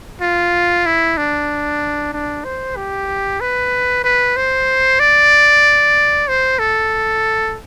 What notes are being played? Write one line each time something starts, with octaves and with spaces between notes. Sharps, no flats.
F4
E4
D4
D4
C5
G4
B4
B4
C5
D5
C5
A4